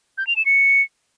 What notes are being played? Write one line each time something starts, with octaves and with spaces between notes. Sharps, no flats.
G6
F7
E7
C#7